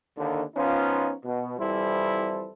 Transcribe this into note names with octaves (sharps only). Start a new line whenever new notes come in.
D#2 D3
F3 B3 C#4 D#4 F4
B2
F2 E3 G3 E4 A4 C5